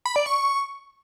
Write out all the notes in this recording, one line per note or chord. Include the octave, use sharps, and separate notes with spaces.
B5
D5
C#6